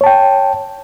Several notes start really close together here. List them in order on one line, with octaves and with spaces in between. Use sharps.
C#5 A5 G5